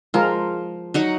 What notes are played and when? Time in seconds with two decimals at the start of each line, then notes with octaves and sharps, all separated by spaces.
0.14 F3 G#3 F4 A#4
0.94 F#3 D#4 F#5